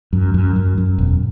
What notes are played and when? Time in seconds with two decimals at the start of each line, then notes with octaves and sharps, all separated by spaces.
0.13 F#2
0.34 F#2
0.56 F#2
0.78 F#2
0.98 E1